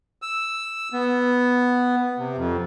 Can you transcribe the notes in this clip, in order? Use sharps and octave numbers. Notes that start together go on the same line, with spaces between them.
E6
B3
C3
F2